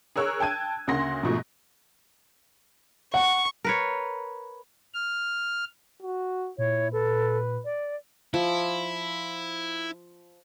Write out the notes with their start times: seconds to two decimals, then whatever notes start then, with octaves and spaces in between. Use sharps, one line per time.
0.16 G#4 A#4 C#5 E6 F#6
0.40 G5 A5 G#6 D#7
0.88 D2 C#3 A#3 F#5 C6 A#6
1.23 G#2 B2 F3 A3
3.14 F#5 C#6
3.64 A#4 B4 C#5
4.94 F6
6.02 F#4
6.58 A#2 E4 C#5
6.93 A4 B4
7.65 D5
8.34 F3 E4